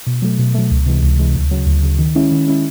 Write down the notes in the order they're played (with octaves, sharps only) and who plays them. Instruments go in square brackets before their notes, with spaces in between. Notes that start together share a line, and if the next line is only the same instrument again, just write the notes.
[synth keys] B2
F#3 A3
B2
F#3 A3
C#2
C3 E3 G#3
C#2
C3 E3 G#3
D2
C#3 F#3
D2
C#3 F#3
D#3
G#3 C#4 E4
D#3
G#3 C#4 E4